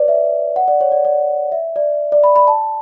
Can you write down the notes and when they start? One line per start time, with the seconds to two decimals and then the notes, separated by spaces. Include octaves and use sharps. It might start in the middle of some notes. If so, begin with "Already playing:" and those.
Already playing: B4 C#5 D5
0.08 E5
0.56 F#5
0.68 D5
0.81 C#5
0.92 D5
1.05 D5
1.52 E5
1.76 D5
2.12 D5
2.24 B5
2.36 B5
2.48 A5